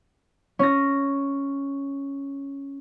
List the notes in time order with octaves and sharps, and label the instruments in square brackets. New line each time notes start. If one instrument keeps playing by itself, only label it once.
[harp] C#4 A#6